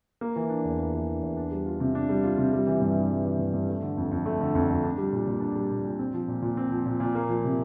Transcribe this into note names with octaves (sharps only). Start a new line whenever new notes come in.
A#3
E3
D4
E2
A#3
E3
D4
E2
D4
G3
F4
C3
D4
G3
F4
C3
G3
E3
G2
G2
G3
E3
G2
G2
A3
D3
F2
F2
A3
D3
F2
F2
D4
G3
A#2
A#2
D4
G3
A#2
A#2
C4
F3
A#2
A#2
C4
F3
A#2
A#2
A#3
F3
C3